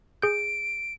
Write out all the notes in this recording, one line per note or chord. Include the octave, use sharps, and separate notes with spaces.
G#4 G6 D7